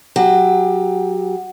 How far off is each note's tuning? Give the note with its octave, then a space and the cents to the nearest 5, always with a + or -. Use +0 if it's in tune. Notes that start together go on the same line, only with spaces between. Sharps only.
F#3 +0 G4 +20